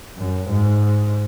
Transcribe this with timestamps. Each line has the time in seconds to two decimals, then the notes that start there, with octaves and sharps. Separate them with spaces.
0.17 F#2
0.50 G#2